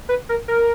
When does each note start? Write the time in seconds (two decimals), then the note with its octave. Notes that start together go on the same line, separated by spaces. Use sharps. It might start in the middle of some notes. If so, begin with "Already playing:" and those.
0.09 B4
0.29 A#4
0.48 A#4